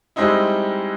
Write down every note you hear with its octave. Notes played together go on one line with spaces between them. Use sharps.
G3 G#3 C4 D#4 E4